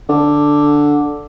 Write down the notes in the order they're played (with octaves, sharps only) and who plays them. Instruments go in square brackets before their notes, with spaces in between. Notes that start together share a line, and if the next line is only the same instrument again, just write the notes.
[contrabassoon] D3